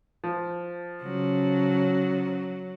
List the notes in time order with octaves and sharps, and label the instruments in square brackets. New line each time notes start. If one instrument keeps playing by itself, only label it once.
[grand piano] F3
[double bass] C#3 C#4 [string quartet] F#3